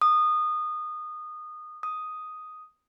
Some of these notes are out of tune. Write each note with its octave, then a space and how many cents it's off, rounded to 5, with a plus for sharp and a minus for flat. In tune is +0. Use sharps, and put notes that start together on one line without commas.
D#6 -20
D#6 +5